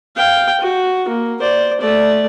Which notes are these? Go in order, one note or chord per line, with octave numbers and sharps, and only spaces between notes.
F5 G5
F#4
A#3
C5 D5
A3 D5